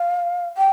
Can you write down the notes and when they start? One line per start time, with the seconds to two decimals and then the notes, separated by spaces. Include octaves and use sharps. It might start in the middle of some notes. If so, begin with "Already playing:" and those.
Already playing: F5
0.57 G5